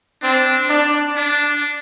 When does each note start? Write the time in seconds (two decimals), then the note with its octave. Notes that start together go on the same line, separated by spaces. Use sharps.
0.23 C4 D4
0.70 D4
1.17 D4